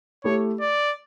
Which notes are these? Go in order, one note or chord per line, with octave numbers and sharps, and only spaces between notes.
A3 E4 G4 C#5
D5